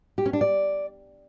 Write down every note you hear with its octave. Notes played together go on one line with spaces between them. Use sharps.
G4
C#4
D4
D5